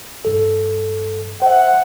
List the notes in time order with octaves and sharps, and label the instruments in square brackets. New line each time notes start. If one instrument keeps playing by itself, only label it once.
[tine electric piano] G2 A4
[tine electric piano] C5 E5 [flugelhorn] F#5